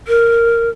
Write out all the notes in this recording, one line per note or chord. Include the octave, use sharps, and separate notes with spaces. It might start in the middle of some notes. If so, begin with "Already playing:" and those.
A#4